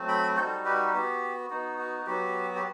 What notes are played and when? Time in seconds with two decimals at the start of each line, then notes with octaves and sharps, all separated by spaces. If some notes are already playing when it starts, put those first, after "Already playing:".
Already playing: F#3 A3 C4
0.08 G5 B5
0.36 G3 D#4 F#4 A4 C5
0.65 G4 B4
0.93 B3 F#4 G4
1.50 B3 D#4 F#4
1.78 F#4
2.06 F#3 B3 F#4 G4
2.55 G4